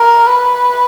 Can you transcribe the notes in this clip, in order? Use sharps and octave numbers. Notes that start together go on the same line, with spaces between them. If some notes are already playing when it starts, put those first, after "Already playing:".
Already playing: A#4
B4